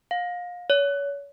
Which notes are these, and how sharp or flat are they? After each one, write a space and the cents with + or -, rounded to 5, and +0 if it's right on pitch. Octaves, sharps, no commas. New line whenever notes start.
F5 +30
C#5 +30